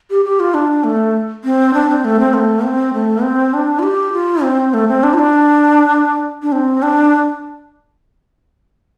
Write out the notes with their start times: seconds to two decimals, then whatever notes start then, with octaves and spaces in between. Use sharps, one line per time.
0.10 G4
0.25 G4
0.40 F4
0.54 D4
0.84 A3
1.44 C4
1.74 D4
1.89 C4
2.05 A3
2.20 C4
2.34 A3
2.64 C4
2.93 A3
3.23 C4
3.53 D4
3.79 F4
3.83 G4
4.13 F4
4.43 C4
4.74 A3
4.88 C4
5.03 D4
5.14 F4
5.19 D4
6.42 D4
6.52 C4
6.83 D4